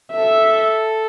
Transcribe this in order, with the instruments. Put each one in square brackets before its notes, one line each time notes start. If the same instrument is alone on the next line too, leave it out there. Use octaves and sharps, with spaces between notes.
[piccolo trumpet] A4 [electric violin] E5